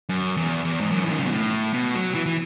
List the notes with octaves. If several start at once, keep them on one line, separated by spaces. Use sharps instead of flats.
F#2
E2
E2
G#2
F#2
E3
D#3
C#3
B2
A2
B2
F#3
E3
E3